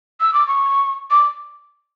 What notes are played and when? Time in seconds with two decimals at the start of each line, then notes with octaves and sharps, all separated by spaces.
0.21 E6
0.34 D6
0.48 C#6
1.11 D6